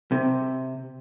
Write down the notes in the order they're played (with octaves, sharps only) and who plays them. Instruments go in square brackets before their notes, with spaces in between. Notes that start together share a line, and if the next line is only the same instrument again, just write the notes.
[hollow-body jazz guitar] C3